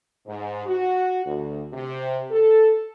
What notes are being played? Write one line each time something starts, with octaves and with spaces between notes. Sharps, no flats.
G#2
F#4
D2
C3
A4